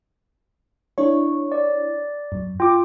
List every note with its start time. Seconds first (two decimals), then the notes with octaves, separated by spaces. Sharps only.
0.98 D4 E4 C#5 C#6
1.52 D5
2.32 F#2
2.60 F4 G5 D6